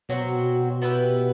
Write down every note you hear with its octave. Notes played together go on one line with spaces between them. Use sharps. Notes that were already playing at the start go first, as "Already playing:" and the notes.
B2 F#3 C4 F#4
B3 E4 G4 B4